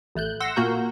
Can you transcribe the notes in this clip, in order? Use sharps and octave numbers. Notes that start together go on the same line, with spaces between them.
A1 A3 F#6 G6
F#5 C6 E6 A#6
A#2 A#3 F#4 A#4 G6